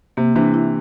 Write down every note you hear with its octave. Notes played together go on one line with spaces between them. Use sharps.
C3 A#3
C3 E3 D4
E4